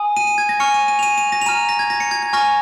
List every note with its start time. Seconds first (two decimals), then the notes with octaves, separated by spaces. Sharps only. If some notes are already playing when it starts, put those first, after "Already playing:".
Already playing: G#5 D#6
0.17 D#7
0.27 D#7
0.38 G#6
0.49 A#6
0.59 G#5 C#6 F6 C#7
0.74 D#7
0.88 D#7
0.99 F7
1.03 D#7
1.18 D#7
1.32 A#6
1.42 F7
1.46 A#5 F6 D#7
1.69 A#6
1.79 G#6
1.90 A#6
2.00 C#7
2.11 G#6
2.23 G#6
2.33 G#5 C#6 F6 A#6